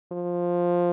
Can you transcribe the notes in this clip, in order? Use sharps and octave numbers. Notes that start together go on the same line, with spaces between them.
F3